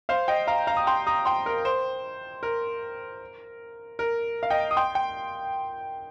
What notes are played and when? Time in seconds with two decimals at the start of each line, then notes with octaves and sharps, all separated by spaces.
0.09 C5 F5
0.28 D#5 G5
0.47 F5 A#5
0.67 F5 A#5
0.77 D#6
0.87 G5 C6
1.07 A#5 D#6
1.25 G5 C6
1.46 A#4
1.65 C5
2.43 A#4
3.99 A#4
4.43 F5
4.50 D#5 G5
4.71 D#6
4.77 G5 C6
4.95 G5